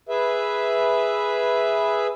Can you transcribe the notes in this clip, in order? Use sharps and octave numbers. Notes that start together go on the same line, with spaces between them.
G#4 B4 E5